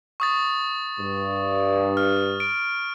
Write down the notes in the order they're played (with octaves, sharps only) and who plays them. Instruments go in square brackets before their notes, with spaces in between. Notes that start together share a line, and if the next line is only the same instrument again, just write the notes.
[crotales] C#6 D#6 A6
[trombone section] G2
[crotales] F6
D7